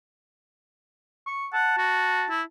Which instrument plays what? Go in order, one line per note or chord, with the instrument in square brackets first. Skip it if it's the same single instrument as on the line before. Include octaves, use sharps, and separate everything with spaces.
[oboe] C#6
[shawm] F#5 [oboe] A5
[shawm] F#4
E4